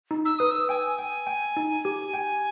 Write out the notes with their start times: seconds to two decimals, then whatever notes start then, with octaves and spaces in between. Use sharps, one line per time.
0.11 D#4
0.25 E6
0.39 B4 D#6
0.51 E6
0.69 G5 G#5
0.99 G5
1.27 G5
1.57 D#4
1.85 G4
2.14 G5